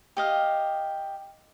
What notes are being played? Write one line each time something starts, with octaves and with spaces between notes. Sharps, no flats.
G4 D#5 F5